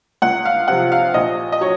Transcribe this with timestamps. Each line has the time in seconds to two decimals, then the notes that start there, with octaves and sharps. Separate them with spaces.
0.22 C#2 F#5
0.45 F5
0.68 C3 F3 F#5
0.92 F5
1.14 A#1 D#5
1.52 D#5
1.61 F#3 C#5